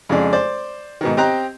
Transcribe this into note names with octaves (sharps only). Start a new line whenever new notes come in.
F2 C#3 G#3 D4
C5 D5
G#2 B2 D#3
C4 G4 D#5 A#5 F#6